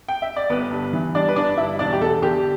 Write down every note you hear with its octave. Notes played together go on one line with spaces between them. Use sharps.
G5
E5
D5
G1 B3 B4
G2
E3
G3 D4 D5
B4
G1 D4 D5
G2 E4 E5
E1 D4 D5
G4
E2 A4
D3 G4